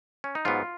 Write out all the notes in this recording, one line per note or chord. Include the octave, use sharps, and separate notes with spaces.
C#4
D#4
G#2 F#3 B3 F4